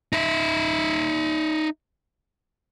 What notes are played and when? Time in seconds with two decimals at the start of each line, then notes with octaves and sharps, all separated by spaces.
0.13 D#4 E5